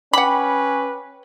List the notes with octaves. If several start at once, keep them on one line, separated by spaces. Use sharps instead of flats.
C#4 B4 F#5 G5 B5 D6